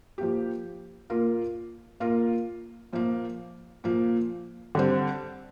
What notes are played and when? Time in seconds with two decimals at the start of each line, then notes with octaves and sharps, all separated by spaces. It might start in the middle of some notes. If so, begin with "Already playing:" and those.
0.18 F3 A#3 G4
1.10 A#2 A#3 F4 A#4
2.00 A#2 A#3 F4 A#4
2.93 A#2 F3 A#3
3.84 A#2 F3 A#3
4.75 D3 G3 C4